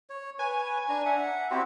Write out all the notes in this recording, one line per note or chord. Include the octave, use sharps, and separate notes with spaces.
C#5
B4 C#5 G#5
D4 A#5
E5 F#5
C4 E4 F#4 G4